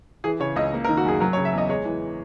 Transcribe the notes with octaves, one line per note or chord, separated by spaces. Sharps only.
E3 G#4
C#3 C#5
C#2 D#5
A#3
A#4
D#3
F#4
F#2 G#4
F#3 A#4
C#5
C#3
E5
E2 D#5
G#3 C#5
E3